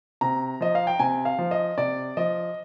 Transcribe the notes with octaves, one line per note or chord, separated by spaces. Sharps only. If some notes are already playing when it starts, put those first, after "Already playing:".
C3 A#5
F3 D#5
F5
G5
C3 G#5
F5
F3
D#5
C3 D5
F3 D#5